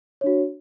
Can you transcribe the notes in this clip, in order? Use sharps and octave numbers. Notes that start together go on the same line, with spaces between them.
D4 F#4 C#5